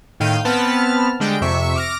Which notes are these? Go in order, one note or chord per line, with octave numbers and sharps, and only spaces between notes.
A2 D#3 F5 G5 G6 D#7
B3 C4 A5 B5 F6
D3 G3 G#3 G5 D7
F2 C3 E5 C#6
D6 F6 A#6